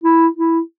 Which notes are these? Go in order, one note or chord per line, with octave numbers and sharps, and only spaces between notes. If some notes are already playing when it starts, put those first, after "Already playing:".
E4
E4